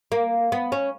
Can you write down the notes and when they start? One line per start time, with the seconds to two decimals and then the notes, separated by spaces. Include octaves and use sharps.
0.12 A#3
0.52 B3
0.72 C#4